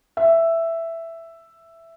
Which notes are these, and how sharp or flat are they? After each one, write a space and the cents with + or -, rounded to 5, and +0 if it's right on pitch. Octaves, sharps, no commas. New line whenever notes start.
E5 +5